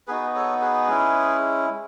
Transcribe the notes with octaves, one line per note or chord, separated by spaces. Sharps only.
B3 D#4 F#4 G#4 B4
A4 C#5
G#4 B4
G#3 C#4 E4